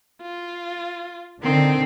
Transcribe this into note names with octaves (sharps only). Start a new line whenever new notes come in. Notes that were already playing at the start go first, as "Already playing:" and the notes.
F4
D3 D#3 C4